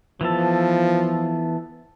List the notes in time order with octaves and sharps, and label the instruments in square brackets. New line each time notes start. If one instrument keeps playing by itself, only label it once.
[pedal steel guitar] E3 B3 A4 [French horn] F3